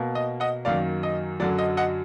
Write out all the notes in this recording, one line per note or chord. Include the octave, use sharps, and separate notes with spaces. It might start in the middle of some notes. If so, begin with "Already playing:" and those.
Already playing: B2 A#3
D#5
D#5 F#5
F#2 D#3 F#3 A#3 D5 F5
D#5
F#2 D3 F#3 D5
D#5
D#5 F#5